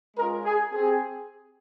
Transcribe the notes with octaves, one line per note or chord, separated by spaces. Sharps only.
G#3 C#4 F4 A#4
G#4
C4 G4 G#4